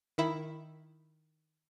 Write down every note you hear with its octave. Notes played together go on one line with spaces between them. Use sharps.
D#3 E4